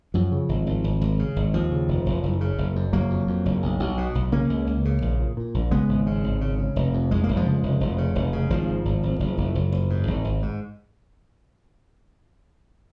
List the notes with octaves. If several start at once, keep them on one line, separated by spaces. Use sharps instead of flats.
F#2 F3
C#3
G#1
G#1
G#1
G#1
C#3
G#1
D#2 F3
C#3
F1
F1
F#1
C#3
F#1
F#2
F#1 F#3 A#3
F2
F2
F#1
B1
B1
B2
B1
C#3 A#3 C#4
C#2
C#2
C#3
A#1
A#2
A#2
A#1
C#3 G#3 B3
G#1
C#3
G#1
C#3
C#3
F1
F2
F1 G#3
F1 A#3
F3 G#3
C#3
F1
F1
C#3
F1
C#3
G#1 F3
G#2
G#1
G#1
F#1
F#1
F#1
F#1
G#2
G#1
G#1
G#2